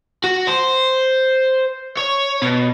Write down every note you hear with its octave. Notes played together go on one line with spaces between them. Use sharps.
F#4
C5
C#5
B2